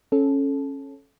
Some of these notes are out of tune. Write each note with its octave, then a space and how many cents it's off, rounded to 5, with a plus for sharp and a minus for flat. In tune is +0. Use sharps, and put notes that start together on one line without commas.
C#4 -15 A4 -15